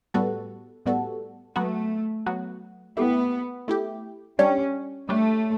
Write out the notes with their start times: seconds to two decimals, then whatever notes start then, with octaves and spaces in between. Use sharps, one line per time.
0.14 A2 G3 B3 F#4 A4
0.86 A2 G3 B3 F#4 A4
1.56 F#3 A3 B3 F#4
2.26 F#3 B3 F#4
2.97 A3 B3 E4 G4
3.68 A3 E4 G4
4.38 G3 C#4 D4 G4 C#5
5.09 G3 A3 D4 G4 C#5